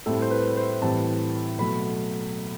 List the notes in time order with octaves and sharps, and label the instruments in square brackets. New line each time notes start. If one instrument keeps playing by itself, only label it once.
[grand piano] A2 G3 C4 A4
C5
B4
C5
A2 E3 G3 C4 A5
B2 F#3 A3 B5